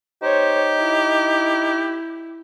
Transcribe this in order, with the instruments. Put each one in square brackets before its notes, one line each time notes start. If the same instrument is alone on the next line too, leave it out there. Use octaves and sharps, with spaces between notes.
[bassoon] D#4 [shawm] G4 [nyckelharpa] C5 C#5
[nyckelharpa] E4